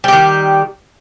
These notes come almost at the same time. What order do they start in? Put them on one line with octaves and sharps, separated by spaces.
G3 G4 D#3